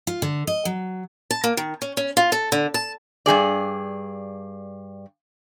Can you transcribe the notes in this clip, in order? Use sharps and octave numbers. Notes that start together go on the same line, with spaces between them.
F4
D3
D#5
F#3
A5
A#3
D#3
C#4
C#4
F4
A4
D3
A5
G2 C#3 G#4 D5